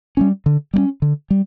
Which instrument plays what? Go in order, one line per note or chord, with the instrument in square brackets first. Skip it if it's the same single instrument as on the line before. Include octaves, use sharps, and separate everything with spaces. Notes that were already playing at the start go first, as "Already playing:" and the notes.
[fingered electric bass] G3 A#3 C#4
D3
G3 A#3 C#4
D3
G3